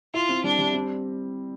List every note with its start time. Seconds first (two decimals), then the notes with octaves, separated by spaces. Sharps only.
0.14 E4 F4
0.29 C4
0.44 G3 D4
0.59 G3
0.74 C4